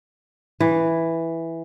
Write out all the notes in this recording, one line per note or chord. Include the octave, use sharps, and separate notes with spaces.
E3